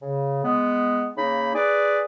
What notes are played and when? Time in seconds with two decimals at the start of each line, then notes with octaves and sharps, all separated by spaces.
0.01 C#3
0.44 G#3 B3
1.17 C#3 A#3 D#4 B5
1.54 G#4 B4 D5